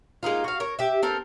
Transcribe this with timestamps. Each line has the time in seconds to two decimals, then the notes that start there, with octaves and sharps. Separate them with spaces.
0.23 G#3 A#3 D#4 F4
0.44 F#4 F5
0.60 A#4 C#5
0.79 G4 E5
1.03 C4 A4 A#4